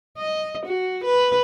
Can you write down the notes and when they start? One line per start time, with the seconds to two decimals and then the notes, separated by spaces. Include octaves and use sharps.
0.18 D#5
0.66 F#4
1.05 B4